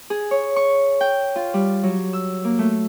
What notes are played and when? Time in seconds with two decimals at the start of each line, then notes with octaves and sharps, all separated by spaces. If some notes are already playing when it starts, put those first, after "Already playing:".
0.10 G#4
0.31 C#5
0.56 C#6
1.01 G5
1.36 F4
1.54 G3
1.83 F#3
2.13 E6
2.45 A#3
2.59 A3